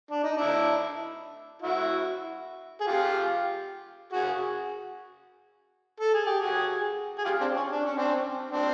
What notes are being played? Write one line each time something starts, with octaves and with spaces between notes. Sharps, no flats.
D4
D#4
D4 E4
E4 F#4
G#4
F4 G4
F#4 G#4
A4
G#4
G4
F#4 G#4
G#4
F4 G4
C4 D4
C#4
D4
C#4
C4 D4
C4 D4